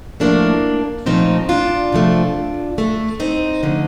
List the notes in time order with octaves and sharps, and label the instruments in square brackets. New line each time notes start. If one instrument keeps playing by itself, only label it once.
[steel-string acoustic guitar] A2 F3 A3 A#3 D4
A#2 F3 A3 C4 D#4
D4 F4
C3 F3 A3
D3 A3
C4 D#4
D3 F3 A3